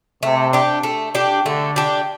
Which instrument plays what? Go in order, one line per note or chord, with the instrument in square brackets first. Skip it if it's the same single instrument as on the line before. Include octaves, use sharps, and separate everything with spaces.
[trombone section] C3 [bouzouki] A3
[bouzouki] D4 G4
A3
D4 G4
[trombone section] D3 [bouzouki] A3
[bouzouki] D4 G4